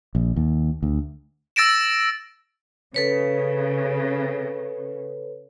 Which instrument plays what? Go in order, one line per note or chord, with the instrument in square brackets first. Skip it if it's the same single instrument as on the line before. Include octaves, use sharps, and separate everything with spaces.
[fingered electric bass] A#1
D#2
D2
[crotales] E6 A6 A#6 D7 E7
[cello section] C#3 [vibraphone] A4 B4 C#5